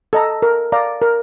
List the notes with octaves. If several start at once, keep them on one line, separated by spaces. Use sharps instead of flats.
A4 D#5 A#5
A#4
D5 F5 A#5
A#4